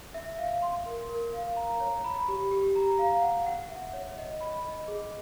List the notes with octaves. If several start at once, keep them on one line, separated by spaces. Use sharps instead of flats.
E5
F5
C6
A#4
A#4
F5
A#5
C#5
B5
G4
G4
A#5
F5
F#5
F#5
E5
C#5
D#5
B5
D#5
G#4